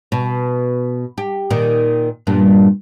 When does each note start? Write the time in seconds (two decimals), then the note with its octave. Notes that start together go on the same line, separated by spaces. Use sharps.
0.12 B2
1.18 G4
1.50 A#2 D#3
2.27 E2 G2 A#2